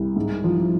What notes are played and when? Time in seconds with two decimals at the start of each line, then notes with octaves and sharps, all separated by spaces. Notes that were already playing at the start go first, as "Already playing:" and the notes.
Already playing: C2
0.16 G#2
0.44 F3